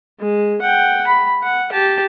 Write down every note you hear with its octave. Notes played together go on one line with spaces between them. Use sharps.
G#3
F#5 G5
B5
F#5
G4 A5